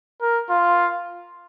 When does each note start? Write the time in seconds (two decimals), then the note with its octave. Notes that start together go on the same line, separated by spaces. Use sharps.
0.21 A#4
0.50 F4